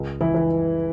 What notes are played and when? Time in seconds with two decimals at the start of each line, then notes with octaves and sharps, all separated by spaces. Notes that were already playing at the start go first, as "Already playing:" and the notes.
Already playing: C#2
0.21 E3 E4
0.35 E3